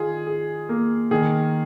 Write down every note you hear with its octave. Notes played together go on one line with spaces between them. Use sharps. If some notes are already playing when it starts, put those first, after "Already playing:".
Already playing: D#3 F4 G#4
G#4
A#3
D#3 G#4